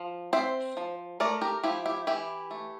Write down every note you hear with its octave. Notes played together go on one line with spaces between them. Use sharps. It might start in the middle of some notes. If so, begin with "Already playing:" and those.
Already playing: F3
C4 C5 E5
F3
A3 A#4 D5
G4 A#4
F3 E4 G4
E4 G4
E3 E4 G4
A3